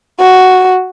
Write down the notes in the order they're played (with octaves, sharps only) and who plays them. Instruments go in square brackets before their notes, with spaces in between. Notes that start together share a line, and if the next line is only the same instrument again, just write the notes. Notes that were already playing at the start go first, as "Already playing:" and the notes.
[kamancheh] F#4